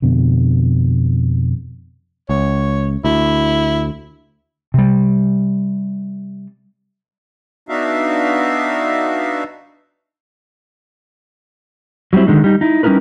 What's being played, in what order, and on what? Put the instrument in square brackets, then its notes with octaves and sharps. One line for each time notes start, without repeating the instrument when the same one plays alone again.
[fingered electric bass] F2 B2 D3
[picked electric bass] C#2 [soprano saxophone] C#5
[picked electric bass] D2 [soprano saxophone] E4
[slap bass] C3 G3
[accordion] B3 D4 D#4 F#4 E5 F5
[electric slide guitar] F#3 G3 A3 C4 E4
D3 D#3 G#3 D#4
G3 D#4
D#4 E4
G3 C#4 D#4 E4 A#4 B4